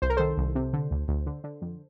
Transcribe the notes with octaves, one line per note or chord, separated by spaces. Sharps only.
C2 C5
A#4
D#3 A4 C5
C2
C3
D3
D2
D2
D3
D3
F2